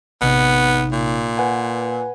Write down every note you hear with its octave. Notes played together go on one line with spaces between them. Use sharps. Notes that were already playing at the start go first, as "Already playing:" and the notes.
A1 C3 B3 D#4
A#2
B4 F#5 G#5